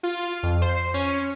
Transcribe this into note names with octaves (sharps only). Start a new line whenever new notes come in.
F4
F2
C5
C#4